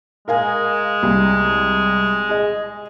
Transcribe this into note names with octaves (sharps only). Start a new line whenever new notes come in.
G#3 A#4 F5 G#5
C2
G#4 D#5